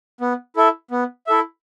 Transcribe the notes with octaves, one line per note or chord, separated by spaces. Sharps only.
B3
E4 A4 E5
B3
E4 A4 E5